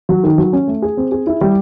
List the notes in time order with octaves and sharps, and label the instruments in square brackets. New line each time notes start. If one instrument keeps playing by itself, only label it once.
[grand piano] F#3
D#3
F#3
C#4
A3
G#4
C4
G#4
E4
G3